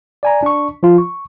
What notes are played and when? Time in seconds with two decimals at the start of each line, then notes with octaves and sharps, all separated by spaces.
0.23 D5 G#5 A#5
0.43 D4 C#6
0.83 F3 F4
0.98 C#6